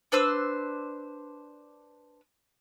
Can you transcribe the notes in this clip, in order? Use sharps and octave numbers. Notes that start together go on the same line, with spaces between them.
D4 B4 C5 E6